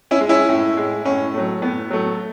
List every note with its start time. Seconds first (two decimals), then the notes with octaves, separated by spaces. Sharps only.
0.11 C#4 E4
0.20 G#3
0.29 C#4 E4
0.49 A2
0.77 G#3
1.05 A2 C#4
1.34 F#3 A3
1.62 A2 B3
1.91 F#3 A3